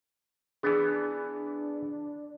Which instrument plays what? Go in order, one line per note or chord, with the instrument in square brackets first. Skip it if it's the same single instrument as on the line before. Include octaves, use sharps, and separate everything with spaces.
[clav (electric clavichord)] E3 B3 [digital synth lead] D4 [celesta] G#4